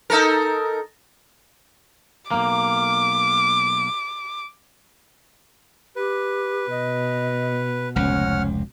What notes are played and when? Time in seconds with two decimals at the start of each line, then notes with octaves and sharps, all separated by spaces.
0.10 D#4 A4 A#4
2.31 B1 G2 A#3 D6
5.96 G4 B4
6.70 B2 D#5
7.96 F1 C#2 C#4 F#5 F6